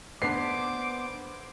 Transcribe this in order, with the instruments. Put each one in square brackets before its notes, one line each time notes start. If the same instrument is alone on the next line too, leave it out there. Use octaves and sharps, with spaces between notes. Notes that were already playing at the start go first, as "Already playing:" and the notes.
[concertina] B3 C5 [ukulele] D4 B4 [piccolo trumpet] D6 [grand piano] C7